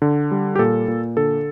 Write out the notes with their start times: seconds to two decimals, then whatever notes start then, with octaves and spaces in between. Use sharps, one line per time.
0.02 D3
0.31 G3
0.55 G4
0.59 A#2 A4
0.88 A#2
1.17 D3 A4